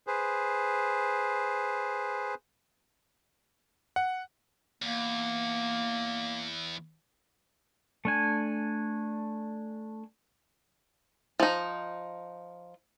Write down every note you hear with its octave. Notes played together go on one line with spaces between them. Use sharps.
G#4 B4 C5
F#5
E2 A#3
A3 D4 G#5
F3 D#4